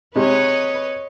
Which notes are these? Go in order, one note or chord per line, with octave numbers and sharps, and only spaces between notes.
C3 G#3 B4 C#5 D#5